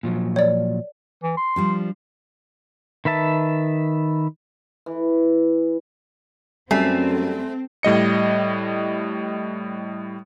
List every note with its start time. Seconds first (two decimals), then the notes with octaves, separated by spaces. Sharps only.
0.03 A#2 F3 F#3
0.36 C#5 D5
1.23 E3
1.37 C6
1.56 F3 G3 D4
3.05 D#3 B4 E5 A5
4.86 E3
6.71 F#2 G3 A3 C4 G#5 C7
7.83 A2 G3 D#5 C#7